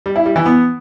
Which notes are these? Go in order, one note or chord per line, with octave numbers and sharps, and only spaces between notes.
G3
E4
G3
E3
B3